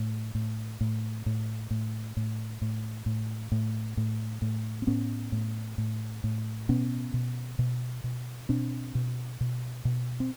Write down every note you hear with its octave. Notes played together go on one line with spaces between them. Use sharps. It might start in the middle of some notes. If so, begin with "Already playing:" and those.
Already playing: A2
A2
A2
A2
A2
A2
A2
A2
A2
A2
A2
C4
A2 B3 C#4
A2
A2
A2
B2 B3 C#4
B2
B2
B2
B2 C4 D4
B2
B2
B2
C4